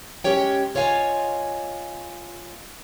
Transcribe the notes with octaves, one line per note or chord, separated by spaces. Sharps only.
G#3 C#4 G4 C#5 G5
F4 C#5 D#5 F5 G#5